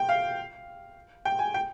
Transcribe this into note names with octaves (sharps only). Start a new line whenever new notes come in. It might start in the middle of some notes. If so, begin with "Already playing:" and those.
Already playing: G5
F5
G5
G#5
G5